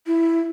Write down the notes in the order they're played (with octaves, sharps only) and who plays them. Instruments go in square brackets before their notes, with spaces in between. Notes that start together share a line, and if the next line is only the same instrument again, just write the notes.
[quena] E4